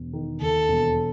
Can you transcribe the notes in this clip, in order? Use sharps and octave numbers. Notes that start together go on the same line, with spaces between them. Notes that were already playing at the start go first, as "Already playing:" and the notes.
Already playing: E1
D#3
D#2 A4
E1